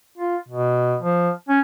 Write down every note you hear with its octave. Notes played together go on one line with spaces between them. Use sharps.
F4
B2
F3
C#4